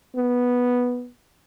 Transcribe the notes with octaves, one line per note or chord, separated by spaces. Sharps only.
B3